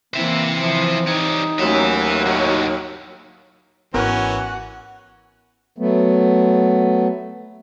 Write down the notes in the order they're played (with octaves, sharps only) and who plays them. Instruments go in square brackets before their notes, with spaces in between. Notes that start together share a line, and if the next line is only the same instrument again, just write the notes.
[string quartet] E3 C4 E4 [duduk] A#3 [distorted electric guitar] C5 E5
[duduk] F3
[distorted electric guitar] G3 C#5 [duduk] D#4
[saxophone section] D#2 F#3 [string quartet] A3 C#4 [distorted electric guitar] B4 E5
[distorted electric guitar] A2 D#3 [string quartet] G4 [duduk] C#5
[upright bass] G#1 [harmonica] E3 C#4 [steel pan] B3 A#4 [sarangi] F#4
[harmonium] F#3 A3 B3